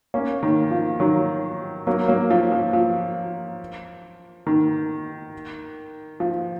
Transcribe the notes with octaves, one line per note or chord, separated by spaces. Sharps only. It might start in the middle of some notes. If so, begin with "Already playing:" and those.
A#3 C#4
D#3
F3
D#3 F#3
F#3 A#3
F#3 A#3
F3
F3
F3
D#3
F3